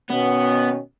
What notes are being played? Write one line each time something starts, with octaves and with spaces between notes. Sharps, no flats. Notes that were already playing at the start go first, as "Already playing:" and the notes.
B2 D#3 B3 C#4